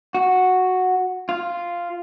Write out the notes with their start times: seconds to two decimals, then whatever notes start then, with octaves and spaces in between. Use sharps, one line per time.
0.15 F#4
1.29 F4